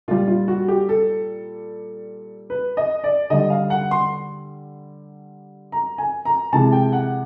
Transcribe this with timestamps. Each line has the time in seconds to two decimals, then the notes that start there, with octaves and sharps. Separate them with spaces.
0.08 A#2 G3 F4
0.28 F4
0.48 F#4
0.68 G4
0.89 A4
2.50 B4
2.77 D#5
3.04 D5
3.30 D3 G3 D#5
3.50 F5
3.70 F#5
3.91 C6
5.72 A#5
5.98 G#5
6.25 A#5
6.53 C3 E3 G#3 A5
6.73 G5
6.92 F#5